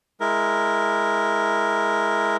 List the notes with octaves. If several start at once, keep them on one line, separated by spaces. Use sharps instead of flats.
G#3 E4 A#4